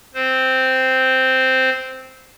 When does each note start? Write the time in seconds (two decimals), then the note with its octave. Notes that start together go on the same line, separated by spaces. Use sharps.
0.14 C4 C5